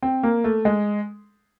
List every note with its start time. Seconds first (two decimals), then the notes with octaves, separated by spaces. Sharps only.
0.03 C4
0.23 A#3
0.44 A3
0.65 G#3